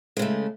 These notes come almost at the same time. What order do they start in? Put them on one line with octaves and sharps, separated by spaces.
G#3 C#3 A3